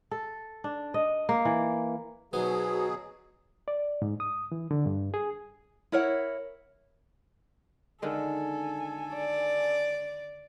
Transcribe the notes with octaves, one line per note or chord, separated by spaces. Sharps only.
A4
D4
D#5
A#3
E3
B2 F#3 B3 D#4 F#4 G#4 C5
D5
G#2
D#6
E3
D3
G2
G#4
E4 A#4 C#5 F#5
D3 D#3 G#3 A4 G#5
D5